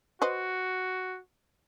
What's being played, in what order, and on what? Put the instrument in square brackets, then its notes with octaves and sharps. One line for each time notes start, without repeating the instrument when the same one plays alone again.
[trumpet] F#4 [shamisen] B4 C5 D#5